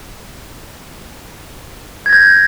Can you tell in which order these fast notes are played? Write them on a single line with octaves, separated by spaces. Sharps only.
G#6 A#6 G6